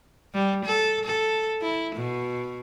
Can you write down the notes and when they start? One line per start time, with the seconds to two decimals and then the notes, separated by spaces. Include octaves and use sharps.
0.34 G3
0.65 A4
1.06 A4
1.62 E4
1.96 B2